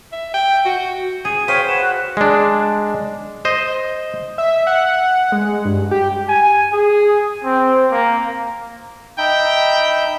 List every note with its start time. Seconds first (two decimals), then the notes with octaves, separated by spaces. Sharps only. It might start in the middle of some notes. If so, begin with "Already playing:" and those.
0.12 E5
0.34 G5
0.65 F#4
1.25 G#4 D#7
1.48 C5 C#5 F5 G5 B6
1.68 B4 F#5 E7
1.81 F#4 F#6
2.17 G#3 D4
3.45 C5 D#5
4.38 E5
4.67 F#5
5.32 G#3
5.65 G2
5.91 G4
6.29 G#5
6.73 G#4
7.45 C4
7.92 A#3
9.18 D#4 E5 G5 B5